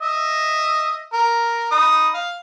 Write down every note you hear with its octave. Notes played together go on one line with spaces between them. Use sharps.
D#5 E5
A#4
D#4 B5 D#6
F5